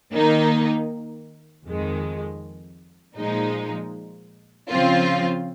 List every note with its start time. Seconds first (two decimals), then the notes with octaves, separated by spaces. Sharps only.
0.13 D#3 A#3 D#4
1.66 F2 D#3 G#3
3.17 A#2 F3 G#3 D#4
4.69 C#3 F3 C4 F4